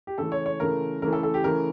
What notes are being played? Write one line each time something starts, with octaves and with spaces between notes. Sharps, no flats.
G4
C#3 E3 A3 A4
C#5
C#5
C#3 E3 A3 A#4
C#3 E3 A3 A#4
A4
A4
G4
C#3 E3 A3 A#4